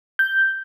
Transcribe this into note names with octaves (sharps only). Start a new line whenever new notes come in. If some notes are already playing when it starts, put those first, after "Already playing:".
G6